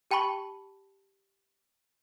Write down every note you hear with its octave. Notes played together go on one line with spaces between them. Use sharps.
G4 G5 A5 B5 C#6 F#7